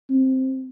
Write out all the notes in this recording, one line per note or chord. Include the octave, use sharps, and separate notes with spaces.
C4